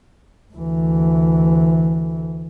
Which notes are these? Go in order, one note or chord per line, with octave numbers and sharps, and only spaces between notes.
D2 E3